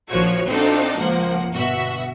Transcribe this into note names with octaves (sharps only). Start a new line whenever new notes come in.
A#1 D#3 F3 F#4 C#5 C#6
C4 D4 D#4 F4 F#4 A4
C#2 F3 A#3 F#5
G1 B2 F#4 E5